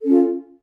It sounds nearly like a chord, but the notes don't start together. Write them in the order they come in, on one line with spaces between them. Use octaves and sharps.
A4 C#4 F4